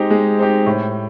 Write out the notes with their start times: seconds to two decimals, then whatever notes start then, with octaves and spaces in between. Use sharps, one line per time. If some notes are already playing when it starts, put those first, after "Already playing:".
Already playing: G#3 C4 D#4 G4
0.11 G#3
0.38 C4 D#4 G4
0.66 A2